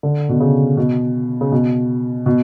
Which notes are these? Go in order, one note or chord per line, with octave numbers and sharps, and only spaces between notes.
D3
B2
C#3
B2
C#3
B2
B2